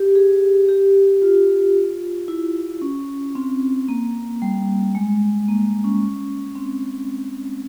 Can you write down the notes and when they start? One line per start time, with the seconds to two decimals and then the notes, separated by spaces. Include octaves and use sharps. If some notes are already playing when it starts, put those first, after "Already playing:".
Already playing: G4
0.15 G#4
0.69 G4
1.22 F4
2.28 E4
2.82 C#4
3.35 C4
3.88 A#3
4.42 G3
4.95 G#3
5.49 A#3
5.84 C#4
6.55 C4